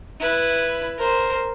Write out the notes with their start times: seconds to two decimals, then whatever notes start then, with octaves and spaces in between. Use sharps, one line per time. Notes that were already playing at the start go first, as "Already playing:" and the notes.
0.20 E4 B4
0.98 A#4 C5